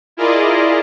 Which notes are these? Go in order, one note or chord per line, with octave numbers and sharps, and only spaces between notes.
E4 F4 G#4 A#4 D5 D#5